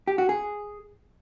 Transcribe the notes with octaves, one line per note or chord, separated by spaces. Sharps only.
G4
F#4
G#4